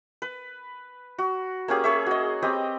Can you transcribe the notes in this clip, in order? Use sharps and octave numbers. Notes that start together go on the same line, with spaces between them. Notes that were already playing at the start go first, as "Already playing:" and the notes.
B4
F#4
A#3 C#4 G4 G#4
G#4 C#5 E5
F#4 D#5
C4 G4 B4 D#5